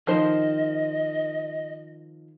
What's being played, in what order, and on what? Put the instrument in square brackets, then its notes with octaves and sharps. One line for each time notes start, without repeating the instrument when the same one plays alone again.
[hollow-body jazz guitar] D#3 [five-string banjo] F3 C5 [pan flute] D#5